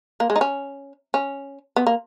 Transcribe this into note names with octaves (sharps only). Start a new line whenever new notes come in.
A#3
G#3
D#4
C#4
C#4
B3
A#3